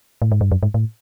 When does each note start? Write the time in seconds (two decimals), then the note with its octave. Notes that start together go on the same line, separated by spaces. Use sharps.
0.22 A2
0.32 G#2
0.41 G2
0.52 F#2
0.63 G#2
0.74 A2